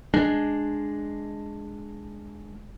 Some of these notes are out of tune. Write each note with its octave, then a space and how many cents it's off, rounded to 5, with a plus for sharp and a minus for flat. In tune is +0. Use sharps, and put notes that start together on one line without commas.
G#3 +0 D4 +5